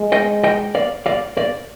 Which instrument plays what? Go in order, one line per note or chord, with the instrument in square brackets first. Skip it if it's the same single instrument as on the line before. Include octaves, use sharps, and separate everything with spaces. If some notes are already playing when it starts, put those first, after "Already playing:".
Already playing: [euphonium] G#3
[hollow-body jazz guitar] D#5 G5
D#5 G5
D5 F5
D5 F5
D5 F5